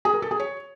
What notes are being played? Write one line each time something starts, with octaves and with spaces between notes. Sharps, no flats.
G#4
A#4
A4
G#4
C#5